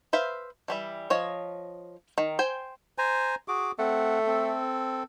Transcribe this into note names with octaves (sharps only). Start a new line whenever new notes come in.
B4 C5 E5 F5
E3 G3 E5
F3 C#5 D#5
D#3
C5 G5 G#5
C5 G#5 A#5
F#4 G#4 D6
A3 C4 F#5
C4 A4